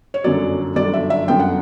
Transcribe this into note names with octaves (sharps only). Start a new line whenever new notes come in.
C#5
G1 F#2 D3 F#3 D5
G1 F#2 D3 F#3 D5
E5
E5
G1 F#2 D3 F#3 G5
F#5